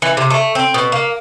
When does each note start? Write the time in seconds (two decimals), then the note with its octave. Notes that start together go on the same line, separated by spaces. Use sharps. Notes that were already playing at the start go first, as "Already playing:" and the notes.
0.02 E3
0.17 C3
0.31 A3
0.55 C4
0.74 B2
0.92 A#3